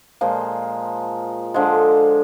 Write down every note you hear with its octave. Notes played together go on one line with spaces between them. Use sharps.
A#2 F3 G#3
D3 F3 G#3